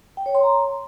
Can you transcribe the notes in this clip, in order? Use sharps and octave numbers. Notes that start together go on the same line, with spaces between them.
G5
C#5
C6
A#5